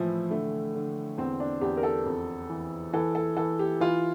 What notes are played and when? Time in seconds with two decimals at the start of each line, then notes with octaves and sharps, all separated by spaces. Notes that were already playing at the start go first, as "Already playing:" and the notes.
Already playing: A2 E3 F3 E4
0.31 D3 A3
0.75 D3
1.17 E2 C4
1.40 D4
1.61 E2 G4
1.77 A#4
1.83 A4
2.05 F2
2.49 E3
2.93 E3 A4
3.15 A4
3.36 E3 A4
3.59 G4
3.80 E3 F4